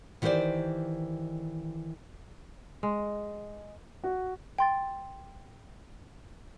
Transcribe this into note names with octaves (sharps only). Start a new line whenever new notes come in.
D#3 E3 F#4 G4 C5 D5
G#3
F#4
G5 C6 A6